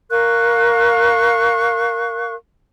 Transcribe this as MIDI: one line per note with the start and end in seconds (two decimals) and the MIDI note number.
0.11 2.34 70
0.11 2.34 77
0.11 2.34 85
0.11 2.34 90